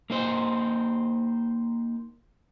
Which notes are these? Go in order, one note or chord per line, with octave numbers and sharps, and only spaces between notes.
A#3 D#4 C5